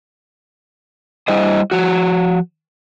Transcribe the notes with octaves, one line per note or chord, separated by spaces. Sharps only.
G3 E4 C5 D#5
F3 F#4